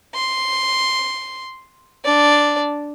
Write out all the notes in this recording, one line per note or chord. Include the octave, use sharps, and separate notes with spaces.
C6
D4 D5